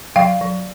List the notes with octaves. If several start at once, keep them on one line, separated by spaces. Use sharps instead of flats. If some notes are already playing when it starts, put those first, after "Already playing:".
F#3 F5 G5
F#3